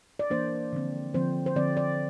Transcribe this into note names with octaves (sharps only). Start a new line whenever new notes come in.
D5
E3 A#3 D4 C5
D3 F3 C4
D3 F3 C4 C5
C5
D3 F3 C4 D5
D5